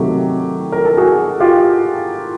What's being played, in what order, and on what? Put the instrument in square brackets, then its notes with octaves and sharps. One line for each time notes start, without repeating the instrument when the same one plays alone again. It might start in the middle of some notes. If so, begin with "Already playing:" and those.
Already playing: [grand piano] C3 D#3 F#3 A3 G4
A#4
A4
F#4 G#4
F4 G4